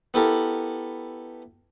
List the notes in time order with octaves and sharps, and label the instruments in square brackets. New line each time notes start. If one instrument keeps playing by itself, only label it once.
[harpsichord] B3 E4 G4 A4 A#4